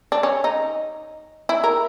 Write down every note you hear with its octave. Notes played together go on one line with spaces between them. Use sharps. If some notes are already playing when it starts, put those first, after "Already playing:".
D4
C#4
D#4
E4
A#4